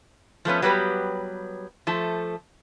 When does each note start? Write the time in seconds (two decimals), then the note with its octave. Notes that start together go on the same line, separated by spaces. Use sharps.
0.45 F3 A3 B3 C#4
0.62 F#3 G3 B3 G4 B4
1.87 F3 A3 A4